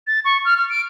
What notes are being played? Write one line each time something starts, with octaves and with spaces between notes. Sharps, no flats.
A6
C#6
F6
F6
D7